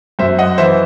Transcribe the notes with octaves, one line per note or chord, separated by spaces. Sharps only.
F#2 C5 E5
D#5 F#5
E3 C5 E5